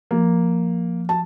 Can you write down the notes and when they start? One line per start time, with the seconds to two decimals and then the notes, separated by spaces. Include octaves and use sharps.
0.11 F3 A#3
1.09 A5